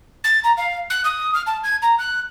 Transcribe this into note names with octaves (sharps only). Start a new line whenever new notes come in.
A6
A#5
F5
F#6
D#6
F6
A5
G#6
A#5
F#6